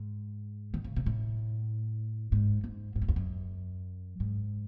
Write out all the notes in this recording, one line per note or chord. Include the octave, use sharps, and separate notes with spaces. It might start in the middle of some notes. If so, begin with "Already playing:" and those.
Already playing: G#2
D#3
C#3
C3
A2
G#2
G#2
G#2
F#2
E2
F#2
G#2